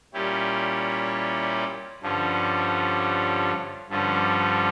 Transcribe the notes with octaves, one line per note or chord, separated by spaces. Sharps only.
A#2 G3 C#4 E4 G4
G2 D3 F3 C#4
G2 D3 F3 C#4